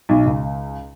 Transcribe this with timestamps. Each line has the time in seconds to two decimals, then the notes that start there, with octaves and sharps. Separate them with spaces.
0.09 B1
0.26 C#2